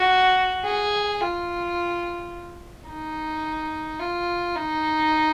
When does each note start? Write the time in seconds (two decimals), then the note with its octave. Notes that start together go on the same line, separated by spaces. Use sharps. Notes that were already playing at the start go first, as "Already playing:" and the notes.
Already playing: F#4
0.65 G#4
1.21 F4
2.87 D#4
3.99 F4
4.55 D#4